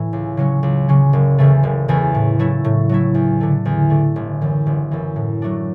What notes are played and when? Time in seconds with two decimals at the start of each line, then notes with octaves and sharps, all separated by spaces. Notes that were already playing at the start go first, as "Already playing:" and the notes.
Already playing: A2 E3
0.13 C#2
0.37 C#3 F#3 C#4
0.63 C#2
0.89 C#3 F#3 C#4
1.13 F#1
1.38 E2 C#3 E3 A3
1.63 F#1
1.88 E2 C#3 E3 A3
2.15 A2
2.39 F#3 A3 E4
2.64 A2
2.89 F#3 A3 E4
3.14 E2
3.41 D3 A3
3.65 E2
3.90 D3 A3
4.16 G1
4.41 F#2 E3
4.66 G1
4.91 F#2 E3
5.16 A2
5.42 F#3 A3 D4